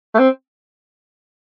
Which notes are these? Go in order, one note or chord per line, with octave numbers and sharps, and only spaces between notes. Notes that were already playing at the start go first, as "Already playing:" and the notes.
A3
C4